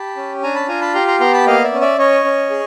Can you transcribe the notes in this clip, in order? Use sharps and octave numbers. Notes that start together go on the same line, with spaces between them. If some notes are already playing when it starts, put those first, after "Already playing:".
Already playing: G4 A5 B5
C#4
D4 G#5 A#5
A5 B5
F4 G#5 A#5
A5 B5
G4 A#5 C6
A#5 C6
B3 A#5 C6
A5 B5
A#3 D#5 F5
D5 E5
C#4
D5 E5
C#4 C#5 D#5
C#4
G#4